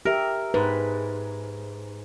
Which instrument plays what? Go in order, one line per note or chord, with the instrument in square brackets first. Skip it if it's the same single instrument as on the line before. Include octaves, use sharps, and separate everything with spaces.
[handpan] G4 E5 [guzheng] A#4
[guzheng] G#2 [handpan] B4